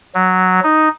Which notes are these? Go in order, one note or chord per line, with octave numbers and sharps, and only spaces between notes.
F#3
D#4